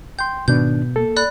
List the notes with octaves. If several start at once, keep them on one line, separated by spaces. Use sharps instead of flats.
G5 C6 G6
G#2 B2 D#3 D4 G6
A#3 A4
D5 B5 F#6